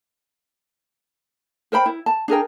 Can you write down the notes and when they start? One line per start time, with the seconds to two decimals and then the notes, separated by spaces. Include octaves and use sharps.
1.72 A#4 C5 G5 B5
1.86 E4
2.06 A5
2.28 D4 G#4 A#4 G5